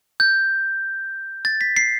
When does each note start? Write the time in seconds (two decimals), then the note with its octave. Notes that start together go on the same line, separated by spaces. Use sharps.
0.20 G6
1.45 A6
1.61 B6
1.77 C7